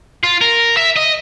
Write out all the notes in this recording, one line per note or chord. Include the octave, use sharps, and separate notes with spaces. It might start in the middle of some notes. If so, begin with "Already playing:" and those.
F4
A#4
E5
D#5